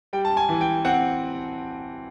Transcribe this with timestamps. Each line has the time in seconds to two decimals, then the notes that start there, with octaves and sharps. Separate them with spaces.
0.13 G3 G5
0.25 A5
0.37 G#5
0.49 E3
0.61 G5
0.85 C4 F#5